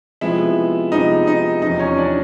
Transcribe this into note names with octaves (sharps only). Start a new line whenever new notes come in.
C3 F3 G#3 B3 E4 E5
C3 F3 G#3 B3 D#4 D#5
D#4 D#5
E2 C3 F3 D#4 D#5
C#4 C#5
D4 D5